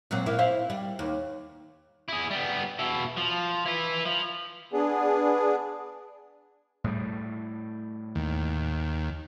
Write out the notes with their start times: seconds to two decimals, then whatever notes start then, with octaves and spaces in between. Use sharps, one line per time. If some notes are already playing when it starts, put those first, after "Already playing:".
0.11 A#2 F#3 C4
0.26 A#3 E4
0.39 E4 C5 F5
0.70 G3
0.99 D#2
2.08 E4 G#4
2.31 G3 B3
2.79 B2 E4
3.17 F3
3.66 E4 B4
4.06 F3
4.73 B3 D4 G#4
6.84 A2 G3
8.15 D#2